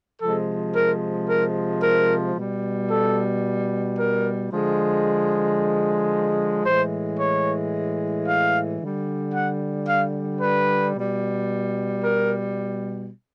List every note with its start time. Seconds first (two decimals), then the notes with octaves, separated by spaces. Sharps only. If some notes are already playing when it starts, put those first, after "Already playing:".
0.21 C3 F3 G#3 A4
0.76 A#4
1.29 A#4
1.83 A#4
2.36 B2 G3
2.90 A4
3.97 A#4
4.51 D3 F3 G#3
6.65 A2 E3 G#3 C5
7.19 C#5
8.27 F5
8.80 D3 G3
9.34 F#5
9.87 F5
10.41 B4
10.95 B2 G3
12.03 A#4